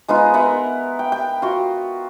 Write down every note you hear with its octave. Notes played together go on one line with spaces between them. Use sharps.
G#3 B3 D#4 F4
B3 A#4 E5 F#5
G5
G5
F4 F#4